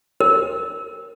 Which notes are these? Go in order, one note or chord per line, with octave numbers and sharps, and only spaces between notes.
A#4